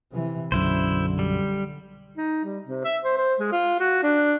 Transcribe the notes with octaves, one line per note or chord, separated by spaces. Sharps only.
C3 E3
B1 F#2 D3 E4 C5
G3
D#4
G3
C3
E5
C5
C5
G#3
F4
F#4
D4